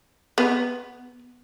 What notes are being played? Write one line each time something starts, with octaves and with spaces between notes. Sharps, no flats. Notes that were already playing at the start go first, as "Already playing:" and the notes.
B3